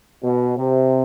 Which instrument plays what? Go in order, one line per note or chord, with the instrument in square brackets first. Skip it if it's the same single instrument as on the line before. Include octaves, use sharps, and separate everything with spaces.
[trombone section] B2
C3